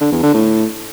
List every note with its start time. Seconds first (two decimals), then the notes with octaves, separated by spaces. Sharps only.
0.01 D3
0.12 E2
0.23 D3
0.34 A2